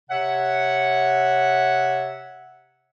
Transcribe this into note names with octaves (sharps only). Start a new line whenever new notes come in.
C3 C#5 E5 F#5